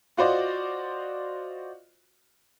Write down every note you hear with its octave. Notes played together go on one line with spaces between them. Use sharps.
F4 F#4 C5 D5 D#5